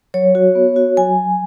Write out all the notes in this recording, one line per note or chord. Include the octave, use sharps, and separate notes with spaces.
F#3 C#5
F#4
B3
F#4
F#3 G#5
F#3